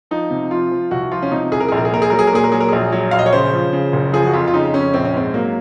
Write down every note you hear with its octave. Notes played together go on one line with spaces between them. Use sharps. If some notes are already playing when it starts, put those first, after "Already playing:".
F3 D#4
C3
F3 F4
F3
C2 F#4
F3 F4
C#4
C3 D#4
C2 G#4
A#4
A#1 G#4
A#4
G#4
A#2 A#4
G#4
F#3 A#4
G#4
A#4
A#2 G#4
A#4
F#3 G#4
A#4
A#1 G#4
F#3
A#1 F5
D#5
C#5
C#3 C5
F3
C#3
F#1
F3 G#4
F#4
F2 F4
F4
C#3 D#4
F2 C#4
A#1 C4
C#4
G#2 C4
F#3 A#3